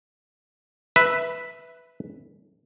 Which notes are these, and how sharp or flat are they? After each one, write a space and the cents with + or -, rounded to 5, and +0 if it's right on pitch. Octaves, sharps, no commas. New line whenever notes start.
B4 +0 E5 +0